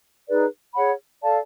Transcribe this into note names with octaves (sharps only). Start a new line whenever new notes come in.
D#4 G#4 B4 D5
G#4 C#5 F#5 B5
A4 D5 F5 A5